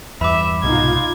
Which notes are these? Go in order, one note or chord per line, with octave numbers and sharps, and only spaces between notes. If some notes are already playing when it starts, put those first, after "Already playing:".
E2 G2 E5 B5 D6
C2 G#2 B2 D#4 F4 G#6